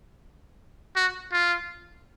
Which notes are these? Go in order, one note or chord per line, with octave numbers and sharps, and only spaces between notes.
F#4
F4